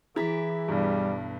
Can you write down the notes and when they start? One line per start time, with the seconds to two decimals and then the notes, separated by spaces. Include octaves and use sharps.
0.16 E3 E4 G#4 A#5 B6
0.68 B1 G2 G3